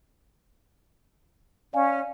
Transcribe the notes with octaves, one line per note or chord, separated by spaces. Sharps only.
C#4 D5 F5 G#5